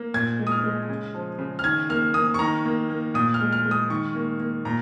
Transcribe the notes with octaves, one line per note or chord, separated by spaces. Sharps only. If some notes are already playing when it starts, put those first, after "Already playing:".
Already playing: A#3
A#2 G#6
G#3
D#6
F6
G#3
C#3
F3
C#3
F6
D#3 G#6
A#3 F6
A#3 D#6
C#6
D#3 A#5
A#3
A#3
A#2 D#6
F6
G#3
F6
G#3
D#6
D#3 C#6
A#3
A#3
A#2 A#5